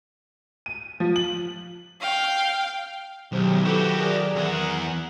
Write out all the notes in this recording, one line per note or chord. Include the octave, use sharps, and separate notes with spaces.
D#7
F3
F#7
F5 G5
B1 D#3 F#3 G#3 D#4 G4 C5
E4 F#4 G4 A4 B4
G#4 A#4 D5
E2 G#4 A#4 F#5